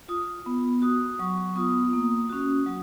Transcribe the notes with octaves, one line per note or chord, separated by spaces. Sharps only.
F4 D#6
B3
F#4 D#6
F#3 C#6
B3 F4 D#6
A#3
C#4 F#4
F#3